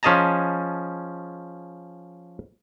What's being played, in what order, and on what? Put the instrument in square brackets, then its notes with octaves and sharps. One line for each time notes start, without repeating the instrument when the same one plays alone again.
[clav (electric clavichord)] F3 C#4 G#4 D#5 A5 A#5